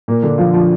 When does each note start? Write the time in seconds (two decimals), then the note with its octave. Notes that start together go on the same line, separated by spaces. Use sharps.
0.08 A#2 A#3
0.23 D3 D4
0.38 F3 F4
0.53 F3 F4